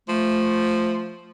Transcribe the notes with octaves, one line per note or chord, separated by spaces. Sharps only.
F3 A3